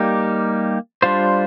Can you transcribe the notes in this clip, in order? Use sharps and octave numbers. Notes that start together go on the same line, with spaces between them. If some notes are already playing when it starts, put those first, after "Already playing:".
Already playing: G3 A#3 D#4 G4
G3 D4 F4 C5